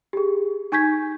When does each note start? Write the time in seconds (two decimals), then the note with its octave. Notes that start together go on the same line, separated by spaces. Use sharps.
0.13 G4 G#4
0.72 D#4 G#5 C#6 G6 G#6 B6